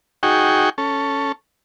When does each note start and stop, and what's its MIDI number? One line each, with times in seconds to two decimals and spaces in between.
0.23 0.70 63
0.23 0.70 66
0.23 0.70 68
0.23 0.70 79
0.23 0.70 85
0.78 1.32 61
0.78 1.32 69